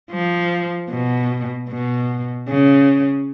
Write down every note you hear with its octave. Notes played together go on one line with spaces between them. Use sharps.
F3
B2
B2
C#3